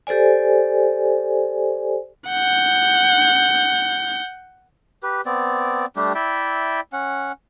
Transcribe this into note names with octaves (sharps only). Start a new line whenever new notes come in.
G4 A4 C5 D5 G#5
F#5 G6
G4 B4
B3 C4 D5
G3 A3 D4 G4
E4 D5 E5 G5
C#4 F#5